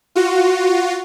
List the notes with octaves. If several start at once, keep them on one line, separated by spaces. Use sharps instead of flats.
F4 F#4